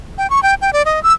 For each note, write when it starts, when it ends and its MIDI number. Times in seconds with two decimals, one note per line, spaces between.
0.18 0.29 79
0.30 0.42 85
0.43 0.54 79
0.61 0.73 79
0.73 0.82 74
0.85 1.02 75
1.03 1.13 88